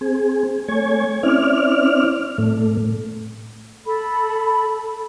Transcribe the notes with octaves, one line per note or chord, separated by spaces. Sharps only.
C4 G#4
A3 C#5 G#5
C4 C#4 E4 D5 F6
A2 A3
A4 B5